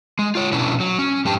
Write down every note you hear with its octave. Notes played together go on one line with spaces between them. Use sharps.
G#3
F4 C#5
B2 C#4 D4 E4
F#3
C#4
F2 G#2 G4 A5